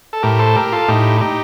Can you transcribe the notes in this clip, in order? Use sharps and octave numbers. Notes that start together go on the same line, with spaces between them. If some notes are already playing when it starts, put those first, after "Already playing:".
A4
A2 G4 A#4
A4 C5
G4 A#4
F4 A4
A2 D#4 G4
D#4 G4